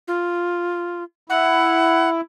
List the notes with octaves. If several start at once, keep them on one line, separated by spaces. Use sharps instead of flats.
F4
E4 F#5